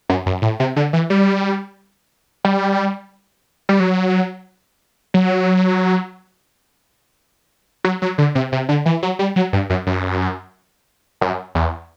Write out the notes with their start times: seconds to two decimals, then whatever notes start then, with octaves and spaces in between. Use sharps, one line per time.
0.09 F#2
0.26 F#2
0.42 A2
0.60 C3
0.76 D3
0.93 E3
1.10 G3
2.44 G3
3.69 G3
3.80 F#3
5.14 F#3
7.84 F#3
8.02 F#3
8.18 D3
8.35 C3
8.52 C3
8.69 D3
8.86 E3
9.03 F#3
9.19 G3
9.36 F#3
9.53 G2
9.70 F#2
9.87 F#2
11.21 F#2
11.55 E2